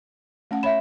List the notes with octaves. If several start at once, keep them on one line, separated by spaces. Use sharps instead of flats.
A3 C#4 F#5
C#5 E5 B5 E7